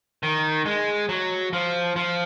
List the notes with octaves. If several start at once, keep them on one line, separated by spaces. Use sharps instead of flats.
D#3
G#3
F#3
F3
F3